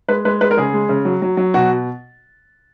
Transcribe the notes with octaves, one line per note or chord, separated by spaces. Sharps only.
G#3 B4
G#3 B4
G#3 B4
A#4
C#3 G#4
G#3
C#3
F#3
F#3
F#3
B2 F#4